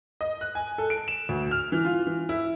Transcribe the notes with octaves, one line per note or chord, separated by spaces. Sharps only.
D#5
F#6
G#5
A4
D7
E7
D2
F6
E3
F4
E3
E4